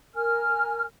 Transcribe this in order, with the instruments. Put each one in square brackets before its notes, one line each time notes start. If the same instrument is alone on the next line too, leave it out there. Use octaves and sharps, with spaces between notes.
[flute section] A#4 G#5 F6